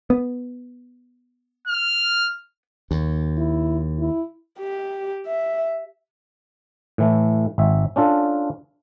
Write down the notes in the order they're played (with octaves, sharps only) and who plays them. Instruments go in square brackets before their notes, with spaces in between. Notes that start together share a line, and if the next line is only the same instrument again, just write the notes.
[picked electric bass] B3
[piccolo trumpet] F6
[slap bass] D#2
[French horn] E4
E4
[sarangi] G4
E5
[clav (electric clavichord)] A2 E3 A3
G#1 E5
C#4 D4 F4 A4